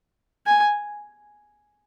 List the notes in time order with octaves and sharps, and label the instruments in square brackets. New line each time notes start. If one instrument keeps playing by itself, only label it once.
[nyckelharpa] G#5